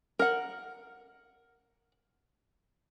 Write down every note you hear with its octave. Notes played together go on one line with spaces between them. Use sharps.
A#4 F#5